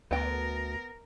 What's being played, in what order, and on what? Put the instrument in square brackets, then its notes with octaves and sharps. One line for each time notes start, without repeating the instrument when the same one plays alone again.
[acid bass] D2 [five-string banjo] B3 G5 [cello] A#4